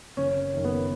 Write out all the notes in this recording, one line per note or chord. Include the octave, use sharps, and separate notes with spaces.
F#1 C#4
F#2 D#3
B3